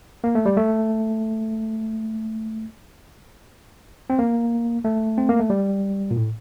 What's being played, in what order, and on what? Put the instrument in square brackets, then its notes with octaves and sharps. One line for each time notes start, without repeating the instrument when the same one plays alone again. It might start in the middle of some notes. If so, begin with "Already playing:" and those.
[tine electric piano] A#3
A3
G3
A3
C4
A#3
A3
C4
A#3
A3
G3
A#2
A2